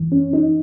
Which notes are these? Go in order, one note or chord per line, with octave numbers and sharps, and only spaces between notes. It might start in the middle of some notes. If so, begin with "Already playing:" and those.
Already playing: F#2 E3
C#4
D#4